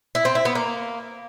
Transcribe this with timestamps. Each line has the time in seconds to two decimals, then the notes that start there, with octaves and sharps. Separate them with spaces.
0.15 E4
0.25 C4
0.35 E4
0.45 B3
0.55 A#3